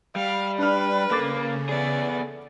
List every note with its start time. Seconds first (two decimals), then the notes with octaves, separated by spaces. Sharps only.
0.16 G3 F5
0.58 D4 B4 F6
1.11 C#3 A#3 A4 D6 A6
1.69 B3 G#4 D5